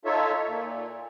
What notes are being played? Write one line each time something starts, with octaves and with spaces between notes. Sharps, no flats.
D#4 F4 A4 C#5 E5
A#2